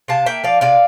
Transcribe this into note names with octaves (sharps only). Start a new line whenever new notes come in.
C3 F5 A5
A#3 E5 G5
F3 D5 F5
C3 D5 F5